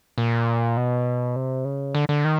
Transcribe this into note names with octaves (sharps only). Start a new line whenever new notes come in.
A#2
B2
C3
C#3
D3
D3
D#3